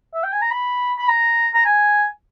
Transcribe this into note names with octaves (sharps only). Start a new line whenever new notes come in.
E5
G5
G#5
A#5
B5
B5
A#5
A#5
G#5